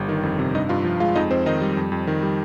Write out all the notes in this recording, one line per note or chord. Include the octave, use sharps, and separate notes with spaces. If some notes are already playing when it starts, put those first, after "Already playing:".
Already playing: G1 G3
D#3
F2
C3
G2 D#4 D#5
G2 F4 F5
F3
G#3 F4 F5
F2 D#4 D#5
F2 C4 C5
D#3 D#4 D#5
G3
F2
F2
D#3
G3